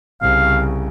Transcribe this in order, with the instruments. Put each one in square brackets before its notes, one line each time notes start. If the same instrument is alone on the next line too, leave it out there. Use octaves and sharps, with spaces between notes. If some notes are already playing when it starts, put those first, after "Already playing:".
[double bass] C2 C#3 [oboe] F5